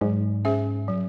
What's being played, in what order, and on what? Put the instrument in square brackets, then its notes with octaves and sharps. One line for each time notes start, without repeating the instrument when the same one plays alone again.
[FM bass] G#2 [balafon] F#3
[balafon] C#4 G#4 C5 E5
F#3